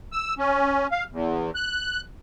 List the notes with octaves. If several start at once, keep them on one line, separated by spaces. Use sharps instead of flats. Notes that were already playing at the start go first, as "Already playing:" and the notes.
E6
C#4
F5
E2
F#6